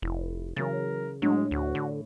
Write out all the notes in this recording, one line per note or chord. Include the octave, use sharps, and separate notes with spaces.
F1 E4
C#3 E3 F#3 A#4 A6
A2 F#3 G#3 D4
D2 F#4
D3